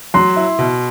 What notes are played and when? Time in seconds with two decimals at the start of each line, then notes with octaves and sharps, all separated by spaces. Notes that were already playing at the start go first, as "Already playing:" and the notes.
0.14 F#3 C6
0.36 E4
0.59 B2